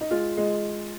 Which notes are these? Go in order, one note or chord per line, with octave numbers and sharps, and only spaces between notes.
D#4
G#3 F4
G#3